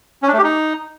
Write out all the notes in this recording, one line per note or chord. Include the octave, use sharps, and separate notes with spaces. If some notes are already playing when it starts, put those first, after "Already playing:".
C#4
D4
A3
G4
D#4